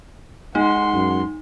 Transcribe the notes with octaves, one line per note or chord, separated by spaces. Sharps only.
G#3 D#4 F#5 C6
F#2